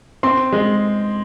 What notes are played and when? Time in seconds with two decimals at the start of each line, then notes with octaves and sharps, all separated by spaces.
0.23 C4 C6
0.52 G#3